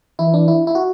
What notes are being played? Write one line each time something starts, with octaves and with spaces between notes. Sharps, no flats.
E3 E4
D4
E4
E4
F#4